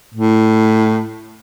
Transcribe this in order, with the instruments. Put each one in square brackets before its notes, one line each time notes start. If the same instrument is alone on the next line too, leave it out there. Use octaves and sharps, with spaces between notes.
[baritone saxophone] A2